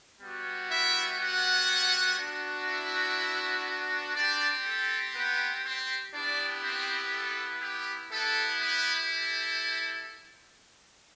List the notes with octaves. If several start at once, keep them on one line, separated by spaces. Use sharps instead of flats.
G3 B3 F#4
E4 E5
F#4 F#5
B3 D4 F#4
E4 E5
C4 D4 G4 D5
A4
B3 B4
C4 C5
B3 D4 E4 G4 D5
C4 C5
A4
G4
B3 E4 G4 A4
B3 B4
A4